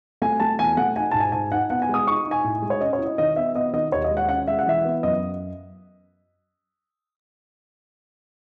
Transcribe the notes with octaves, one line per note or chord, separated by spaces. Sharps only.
A3 G#5
A3 A5
E2 G#5
A3 F#5
D#4 G#5
G#2 A5
G#5
G#2 G#5
D#4 F#5
B3 F#5
G#5
G#3
D#6
D#4 C#6
D#4
G#5
A2
G#3
C#5
C#4 D#5
C#5
E4
D#5
D#3 D#5
B3 E5
B3 D#5
D#3 D#5
D#2 C#5
D#5
G#3
F#5
C#4 F#5
G#3 E5
F#5
E3 E5
B3
F#2 D#5